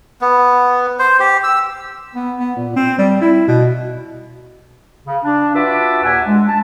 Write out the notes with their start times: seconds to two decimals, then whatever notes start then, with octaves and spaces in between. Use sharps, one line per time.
0.21 B3
0.99 C5
1.20 G4
1.44 E6
2.15 B3
2.38 B3
2.56 A#2
2.76 C4
2.98 G3
3.21 E4
3.48 B2
5.06 C#3
5.24 D4
5.53 F4 F#4 B4 E5 A5 D6
6.02 D#2 A#2 E5 F#5 G#5 E6
6.25 G#3 D4
6.47 A5